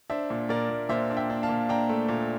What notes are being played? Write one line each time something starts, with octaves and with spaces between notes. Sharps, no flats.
D4 C5 E5
A#2
A#2 A#4 D5
A#2
A#2 C5 E5
D4
E5 G5
D4
F5 A5
A#2
D4 G5 A#5
A3
A#2